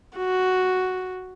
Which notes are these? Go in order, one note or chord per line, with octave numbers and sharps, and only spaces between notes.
F#4